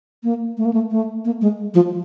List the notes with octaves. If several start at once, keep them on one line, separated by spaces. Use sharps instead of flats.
A#3
A3
A#3
A3
A3
A#3
G#3
F3